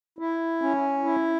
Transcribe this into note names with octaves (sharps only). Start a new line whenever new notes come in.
E4
C#4
E4